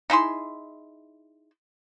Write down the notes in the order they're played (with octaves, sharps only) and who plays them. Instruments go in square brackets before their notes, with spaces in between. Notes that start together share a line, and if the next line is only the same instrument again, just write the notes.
[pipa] D#4 E4 G#4 C6